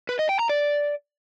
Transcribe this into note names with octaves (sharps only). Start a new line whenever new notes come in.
B4
D#5
G5
A#5
D5